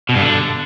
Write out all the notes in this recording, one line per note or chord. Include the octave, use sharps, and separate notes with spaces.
B2
G2
D3